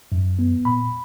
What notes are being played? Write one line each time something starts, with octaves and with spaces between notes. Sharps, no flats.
F#2
B3
A#2 B5